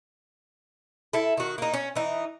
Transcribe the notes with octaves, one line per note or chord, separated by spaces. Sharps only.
E4 A4
D#3 F#4
A#3 D#4
C#4
E3 D#4